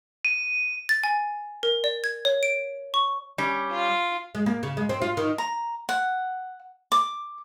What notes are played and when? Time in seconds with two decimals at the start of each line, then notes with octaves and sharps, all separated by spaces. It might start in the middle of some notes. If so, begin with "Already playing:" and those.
0.25 D#7
0.89 A6
1.04 G#5
1.63 A#4
1.84 D5
2.04 G#6
2.25 C#5
2.43 D7
2.94 C#6
3.38 G3 C#4
3.71 F4
4.35 G#3
4.46 A#3
4.63 C#3
4.77 G#3
4.89 C4
5.02 F4
5.17 D#3
5.38 A#5
5.89 F#5
6.92 D6